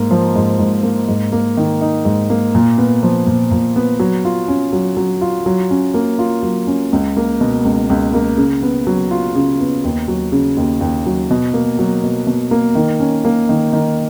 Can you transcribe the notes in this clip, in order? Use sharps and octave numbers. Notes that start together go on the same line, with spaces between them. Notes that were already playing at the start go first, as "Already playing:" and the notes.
Already playing: G#2 A#3
F3
G#2
G#2
A#3
G#2
A#3
D#3
D#4
G#2
A#3
A#2
B3
F3
A#2
A#2
B3
F#3
F4
C#4
F#3
F#3
F4
F#3
C#4
A#3
F4
F#3
C#4
C#2
A#3
B2
C#2
C#2
A#3
C#3
B3
F#3
F4
C#3
B3
D#2
F#3
C#3
D#2
D#2
F#3
B2
A#3
F#3
B2
B2
A#3
D#3
C#4
A#3
D#3
D#3